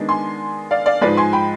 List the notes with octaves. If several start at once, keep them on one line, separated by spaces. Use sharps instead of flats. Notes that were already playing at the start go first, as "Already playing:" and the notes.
Already playing: D#3 G#3 B3 D4
G#5 C6
D5 F5
D5 F5
G#2 F3 G#3 B4 D5
G#5 C6
G5 B5